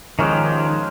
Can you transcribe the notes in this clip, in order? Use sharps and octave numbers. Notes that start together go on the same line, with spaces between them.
D#3 F3 G#3 C#4 D#4 G4